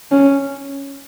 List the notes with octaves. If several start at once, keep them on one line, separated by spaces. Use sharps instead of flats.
C#4